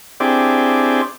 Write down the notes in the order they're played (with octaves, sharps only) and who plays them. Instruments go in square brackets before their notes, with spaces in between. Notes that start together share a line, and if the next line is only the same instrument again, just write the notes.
[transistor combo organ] C4 D4 E4 G4 G#4 D5